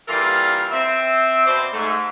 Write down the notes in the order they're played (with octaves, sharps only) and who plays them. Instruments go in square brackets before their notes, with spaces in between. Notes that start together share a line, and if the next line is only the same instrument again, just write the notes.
[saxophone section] E3 G3 A#3 F4 A4 A#4
C4 E5
B2 C5 D5
G#2 A3